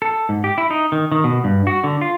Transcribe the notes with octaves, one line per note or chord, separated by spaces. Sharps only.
A4
G#2
G4
E4
D#4
D#3
D#3
B2
G2
F#4
D3
F4